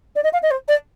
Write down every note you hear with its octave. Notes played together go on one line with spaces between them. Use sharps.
D5
D#5
F5
D#5
C5
D5